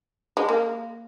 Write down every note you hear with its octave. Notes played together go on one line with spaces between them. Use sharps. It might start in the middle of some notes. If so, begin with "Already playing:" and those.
G#3
A#3